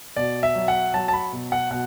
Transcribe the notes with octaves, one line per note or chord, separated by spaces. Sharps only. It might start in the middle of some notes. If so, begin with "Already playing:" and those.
B2 D5
E5
F#3
F#5
F#3 A5
A5
B5
B2
F#5
B2 F#5